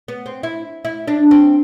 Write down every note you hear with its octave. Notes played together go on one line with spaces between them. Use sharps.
B3
C4
E4
E4
D4
C4